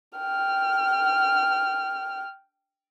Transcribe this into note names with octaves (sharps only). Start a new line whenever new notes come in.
G5 F6